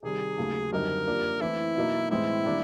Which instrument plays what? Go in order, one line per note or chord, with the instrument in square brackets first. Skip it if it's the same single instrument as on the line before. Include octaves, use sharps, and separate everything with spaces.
[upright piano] C3 D#3 G3 [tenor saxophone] G#4
[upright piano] D#2 C#3 F#3 A3
[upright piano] F#2 D3 G3 C4 D#4 [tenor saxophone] A#4
[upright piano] F3 A#3 D4 G4
[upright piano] E3 A3 C4 [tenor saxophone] E4
[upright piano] B2 F#3 A#3 D#4
[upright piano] A2 E3 G#3 C4 [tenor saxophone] E4
[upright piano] D#3 G3 A#3 D4 G4